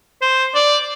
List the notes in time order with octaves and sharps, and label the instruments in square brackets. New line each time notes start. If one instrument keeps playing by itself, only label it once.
[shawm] C5
D5